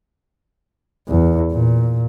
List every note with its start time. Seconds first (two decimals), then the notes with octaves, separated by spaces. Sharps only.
1.08 E2
1.52 A#2